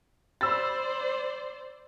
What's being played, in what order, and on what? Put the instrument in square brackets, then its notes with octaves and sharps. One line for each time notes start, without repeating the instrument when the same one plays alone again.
[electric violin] C5 D5 [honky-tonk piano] B5 E6 A6